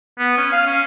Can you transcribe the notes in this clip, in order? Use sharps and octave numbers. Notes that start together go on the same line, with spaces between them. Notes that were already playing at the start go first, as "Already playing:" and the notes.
B3
C#4
F5
C#4